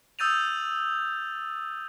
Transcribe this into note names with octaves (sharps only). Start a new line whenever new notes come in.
D#6 E6 G6 A6 D#7 F7